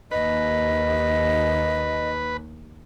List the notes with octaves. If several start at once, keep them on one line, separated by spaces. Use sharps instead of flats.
D#2 B4 D#5